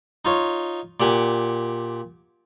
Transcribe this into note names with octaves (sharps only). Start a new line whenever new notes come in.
D#4 F4 C#5
A#2 G4 F#5 G#5 D6